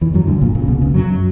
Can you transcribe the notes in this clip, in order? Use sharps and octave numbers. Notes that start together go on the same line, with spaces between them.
E2 E3
F#2 F#3
D2 D3
A#1 A#2
A#1 A#2
C#3
B1 B2
C#2 C#3
F#2 F#3